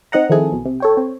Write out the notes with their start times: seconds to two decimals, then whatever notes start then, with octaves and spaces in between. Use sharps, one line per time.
0.12 C4 D#4 D#5 F#5 A#5
0.30 D#3 F3 C4 E4 G#4 A4
0.52 B1 B2
0.66 C3
0.80 A4 C#5 G5
0.97 C4